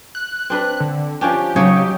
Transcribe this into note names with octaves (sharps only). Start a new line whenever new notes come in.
F#6
C4 D4 B4
D3
F3 C#4 D4 G4
C#3 F#3 D#4 G4 C#5